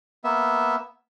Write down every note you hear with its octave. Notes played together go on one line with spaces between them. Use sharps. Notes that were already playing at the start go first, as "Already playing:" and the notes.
A#3 B3 E5